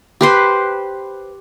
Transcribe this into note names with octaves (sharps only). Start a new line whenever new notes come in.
G4 B4 C5